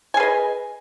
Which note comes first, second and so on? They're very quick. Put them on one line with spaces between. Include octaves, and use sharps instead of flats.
G#5 G#4 B4 D#5